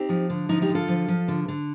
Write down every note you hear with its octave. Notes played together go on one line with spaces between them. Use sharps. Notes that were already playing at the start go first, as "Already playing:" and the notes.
Already playing: C4 D#4 G4
F3
D3
F3 D#4
D#4 G4
D3
F4 A4
F3
F3
D3
D3